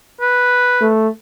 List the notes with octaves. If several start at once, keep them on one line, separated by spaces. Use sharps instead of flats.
B4
A3